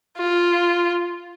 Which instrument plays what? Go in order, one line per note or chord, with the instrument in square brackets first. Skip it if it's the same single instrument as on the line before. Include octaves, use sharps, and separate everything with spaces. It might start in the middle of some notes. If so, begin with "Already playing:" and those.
[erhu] F4